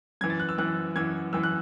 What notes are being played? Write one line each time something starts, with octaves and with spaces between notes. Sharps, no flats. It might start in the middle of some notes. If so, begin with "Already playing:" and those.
F#2 E3 G#6
A6
F#6
E6
F#2 E3 F#6
F#2 E3 G#6
F#2 E3 E6
F#6